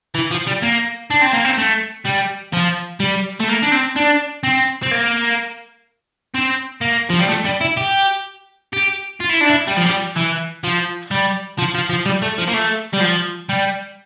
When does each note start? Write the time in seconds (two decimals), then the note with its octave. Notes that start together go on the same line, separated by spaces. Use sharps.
0.15 E3
0.31 F3
0.47 G3
0.62 A#3
1.10 D4
1.21 C4
1.33 A#3
1.44 C4
1.58 A3
2.05 G3
2.53 F3
3.00 G3
3.40 A3
3.48 A#3
3.62 D4
3.72 C4
3.96 D4
4.44 C4
4.83 C4
4.91 A#3
6.35 C4
6.81 A#3
7.10 F3
7.19 G3
7.29 A3
7.45 G3
7.61 E4
7.77 G4
8.73 G4
9.21 F4
9.30 E4
9.41 D4
9.50 E4
9.67 G3
9.76 F3
9.86 G3
10.16 E3
10.64 F3
11.11 G3
11.59 F3
11.75 F3
11.90 F3
12.06 G3
12.22 A3
12.38 F3
12.48 A#3
12.54 A3
12.94 G3
13.01 F3
13.49 G3